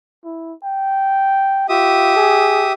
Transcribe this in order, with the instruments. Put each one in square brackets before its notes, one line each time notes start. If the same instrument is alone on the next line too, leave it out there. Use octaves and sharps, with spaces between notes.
[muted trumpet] E4
G5
[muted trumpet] F4 [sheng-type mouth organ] G4 E5 D#6
[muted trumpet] G#4